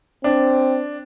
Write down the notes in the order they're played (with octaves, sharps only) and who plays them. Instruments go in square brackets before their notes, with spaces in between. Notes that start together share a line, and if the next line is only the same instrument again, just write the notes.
[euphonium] C4 [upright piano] D4